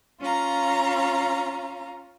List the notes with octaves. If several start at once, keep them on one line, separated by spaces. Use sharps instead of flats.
C#4 F4 F5 A#5